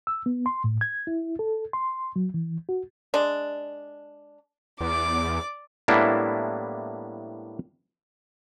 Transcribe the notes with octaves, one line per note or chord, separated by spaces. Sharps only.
E6
B3
C6
A2
G#6
E4
A4
C6
F#3
E3
F#4
G#3 D4
E2 D5 D6
A2 G3 A#3 B3 D4 E4